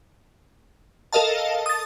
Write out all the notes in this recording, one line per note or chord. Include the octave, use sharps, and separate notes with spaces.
A4 A#4 D#5 F5 A5
D#6 A6